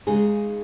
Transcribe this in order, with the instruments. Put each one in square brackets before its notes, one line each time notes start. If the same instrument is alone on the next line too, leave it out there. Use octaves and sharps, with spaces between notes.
[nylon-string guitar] C#3 G#3 D#4 G#4